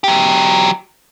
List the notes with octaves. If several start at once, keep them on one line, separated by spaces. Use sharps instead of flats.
F#3 G4